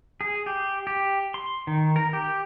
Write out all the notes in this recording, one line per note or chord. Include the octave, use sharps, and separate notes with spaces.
G#4
G4
G4
C6
D#3
A#4
G4